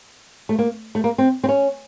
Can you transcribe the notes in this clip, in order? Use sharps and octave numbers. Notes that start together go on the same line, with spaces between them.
A3
A#3
A3
A#3
C4
C4
C#4